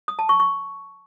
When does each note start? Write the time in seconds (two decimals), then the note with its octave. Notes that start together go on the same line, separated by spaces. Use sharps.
0.08 D#6
0.19 A5
0.29 C#6
0.40 C#6